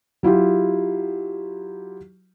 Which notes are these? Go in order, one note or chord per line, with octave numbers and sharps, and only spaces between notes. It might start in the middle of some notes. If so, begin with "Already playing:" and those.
F#3 E4 F4 G4